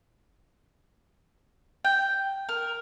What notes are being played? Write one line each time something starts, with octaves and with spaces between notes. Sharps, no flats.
G5
A#4